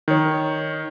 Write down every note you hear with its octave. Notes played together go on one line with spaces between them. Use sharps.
D#3 C#5